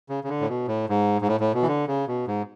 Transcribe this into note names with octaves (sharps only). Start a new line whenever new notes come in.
C#3
C#3
D3
A2
B2
A2
G#2
G#2
A2
A2
B2
E3
D3
C#3
B2
G#2